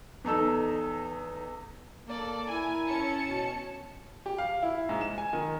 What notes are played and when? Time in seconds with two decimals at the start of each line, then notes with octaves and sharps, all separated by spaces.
0.24 E2 D#4 A4 E6
2.07 A#3 A4 D5
2.47 E4 A#4 G#5
2.86 C#4 A5 C#7
3.24 B2
4.26 G4
4.38 F5
4.63 E4
4.89 G#2
5.01 E7
5.18 G#5
5.33 D#3